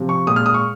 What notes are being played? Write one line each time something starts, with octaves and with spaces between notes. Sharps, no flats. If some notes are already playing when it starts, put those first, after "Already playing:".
Already playing: C3 F3
C#6
A#2 G#3 D#6
F6
D#6
C#6